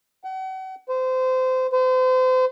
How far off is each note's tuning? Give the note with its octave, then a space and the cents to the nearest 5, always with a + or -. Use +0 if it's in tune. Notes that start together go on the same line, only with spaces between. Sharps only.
F#5 +40
C5 -25
C5 -35